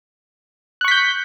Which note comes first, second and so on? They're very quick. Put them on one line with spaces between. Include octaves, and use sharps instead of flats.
F#6 C#6 B6 G6